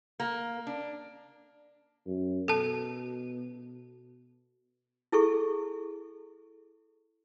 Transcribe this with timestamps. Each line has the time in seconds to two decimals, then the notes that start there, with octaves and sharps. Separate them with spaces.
0.20 A#3
0.67 D4
2.07 F#2
2.48 B2 A4 A5
5.12 E4 G#4 A4 C#6